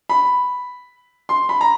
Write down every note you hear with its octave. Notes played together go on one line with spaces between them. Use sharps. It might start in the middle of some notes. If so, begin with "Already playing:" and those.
B5
C6
B5
A#5